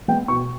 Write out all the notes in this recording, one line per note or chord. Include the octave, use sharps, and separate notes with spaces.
G#3 B3 G5
B2 C#6